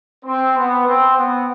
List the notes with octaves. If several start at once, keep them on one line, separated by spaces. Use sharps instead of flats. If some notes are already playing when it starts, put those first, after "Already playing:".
C4
B3
C4
B3